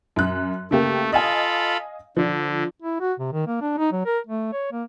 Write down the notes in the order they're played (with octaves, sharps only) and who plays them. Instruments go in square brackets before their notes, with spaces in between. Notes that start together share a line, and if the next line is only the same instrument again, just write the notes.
[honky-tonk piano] F#2 F#6
[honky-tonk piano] C#3 A#3 G4 [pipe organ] A3
[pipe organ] F4 A4 B5 [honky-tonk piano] D#5 F5 G#5
[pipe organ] D3 [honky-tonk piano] F3 D4
[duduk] E4
F#4
C3
D#3
A#3
D4
D#4
F#3
A#4
A3
C#5
A#3